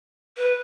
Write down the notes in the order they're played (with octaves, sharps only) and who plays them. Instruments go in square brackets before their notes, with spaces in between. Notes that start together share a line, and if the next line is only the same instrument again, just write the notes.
[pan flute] B4